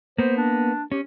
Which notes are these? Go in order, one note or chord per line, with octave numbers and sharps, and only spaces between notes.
A#3 B3 C5
D4
C#4 G4